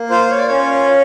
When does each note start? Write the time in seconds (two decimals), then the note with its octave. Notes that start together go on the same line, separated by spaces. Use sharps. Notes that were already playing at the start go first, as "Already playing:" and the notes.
Already playing: A#3
0.10 F4 C5
0.30 C#5
0.38 D5
0.48 C#4 C#5